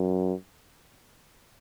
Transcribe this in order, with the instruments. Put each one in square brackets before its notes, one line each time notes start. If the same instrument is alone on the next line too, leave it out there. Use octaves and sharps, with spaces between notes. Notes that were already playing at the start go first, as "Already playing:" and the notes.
Already playing: [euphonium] F#2